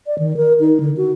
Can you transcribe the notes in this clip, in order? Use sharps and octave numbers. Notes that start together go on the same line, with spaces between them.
D5
D#3
A#4
D#4
D3
F#4